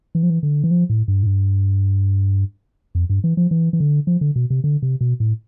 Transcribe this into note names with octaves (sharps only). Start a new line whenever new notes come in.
E3
F3
E3
D3
E3
F3
A2
G2
A2
G2
F2
G2
E3
F3
E3
E3
D3
F3
D3
B2
C3
D3
C3
B2
A2